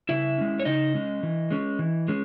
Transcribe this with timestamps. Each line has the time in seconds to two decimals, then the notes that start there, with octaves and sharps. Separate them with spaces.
0.09 C#3 E4 E5
0.38 G#3 C#4
0.60 C#5
0.65 C#3 D#4 D#5
0.95 G#3 C#4
1.23 E3
1.51 G#3 C#4
1.79 E3
2.08 G#3 C#4